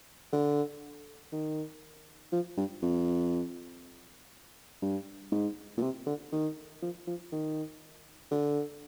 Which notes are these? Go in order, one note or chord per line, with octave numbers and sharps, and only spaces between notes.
D3
D#3
F3
G2
F2
G2
G#2
A#2
C3
D3
D#3
F3
F3
D#3
D3